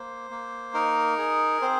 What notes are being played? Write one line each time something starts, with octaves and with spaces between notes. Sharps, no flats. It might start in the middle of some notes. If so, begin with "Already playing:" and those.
Already playing: A#3 C5
A#3
D#4 A#4
G#4
C4 C5